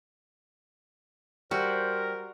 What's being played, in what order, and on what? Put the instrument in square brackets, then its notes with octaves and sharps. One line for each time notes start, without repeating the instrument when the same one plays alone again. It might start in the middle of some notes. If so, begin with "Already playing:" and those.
[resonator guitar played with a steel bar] G3 [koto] F#4 [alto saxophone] A#4 [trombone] C5